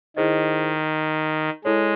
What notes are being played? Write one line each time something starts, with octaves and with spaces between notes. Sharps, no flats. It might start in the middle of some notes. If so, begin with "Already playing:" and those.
D#3 E4 G#4 C5 D#5
G#3 E4 A4 C#5